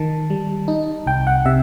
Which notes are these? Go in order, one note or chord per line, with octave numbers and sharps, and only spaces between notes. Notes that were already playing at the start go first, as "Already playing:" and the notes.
Already playing: D#3 A5
G3
D#4
C2 G5
F#5
C3 E5